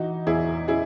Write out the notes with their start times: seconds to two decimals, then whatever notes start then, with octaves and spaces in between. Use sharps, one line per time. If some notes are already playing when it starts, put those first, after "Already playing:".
Already playing: E3 D#4 F#4
0.26 E2 E4 G#4
0.68 C#3 E4 G#4